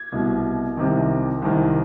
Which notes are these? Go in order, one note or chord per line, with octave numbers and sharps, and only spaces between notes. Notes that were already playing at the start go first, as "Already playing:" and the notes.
Already playing: G#6
C2 B2
C2 C3 D#3
C2 C3 D#3